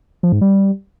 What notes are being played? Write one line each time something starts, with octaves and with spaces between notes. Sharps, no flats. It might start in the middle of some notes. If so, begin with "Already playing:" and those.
F3
G#2
G3